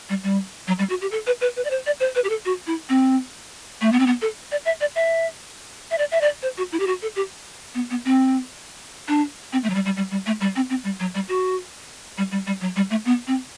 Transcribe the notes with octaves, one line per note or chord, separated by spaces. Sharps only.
G3
G3
F#3
G3
F#4
G4
A4
B4
B4
B4
D5
C5
D5
C5
B4
G4
A4
F#4
E4
C4
A3
B3
C4
B3
A4
D5
E5
D5
E5
E5
D5
E5
D5
C5
F#4
E4
G4
F#4
A4
G4
B3
B3
C4
D4
C4
A3
F#3
G3
G3
G3
G3
A3
G3
C4
C4
G3
F#3
G3
F#4
G3
G3
G3
F#3
G3
A3
B3
C4